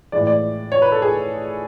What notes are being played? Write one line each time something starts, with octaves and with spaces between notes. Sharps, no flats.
A2 E3 G#3 D5
D5
C#5
B4
A4
G#4